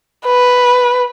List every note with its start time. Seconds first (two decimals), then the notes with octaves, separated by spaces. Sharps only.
0.26 B4